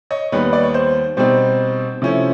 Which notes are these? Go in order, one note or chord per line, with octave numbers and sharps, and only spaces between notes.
C#5 D#5
D#2 D#3 G3 B3 B4 C#5
D5
C#5
C5
B2 G3 C4 D#4 C5
C3 F3 A3 C#4 E4